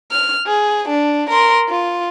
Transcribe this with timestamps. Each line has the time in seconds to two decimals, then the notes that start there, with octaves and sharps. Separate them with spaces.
0.11 F6
0.47 G#4
0.89 D4
1.30 A#4 C6
1.69 F4